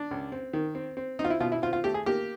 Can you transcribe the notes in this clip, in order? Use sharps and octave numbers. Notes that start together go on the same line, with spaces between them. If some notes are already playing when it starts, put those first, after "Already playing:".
Already playing: D4
C#2
C4
D#3
C4
C4
C4 D#4
F4
E4
B2 F4
E4
C4 F4
F4
A3 G4
G#4
A#3 G4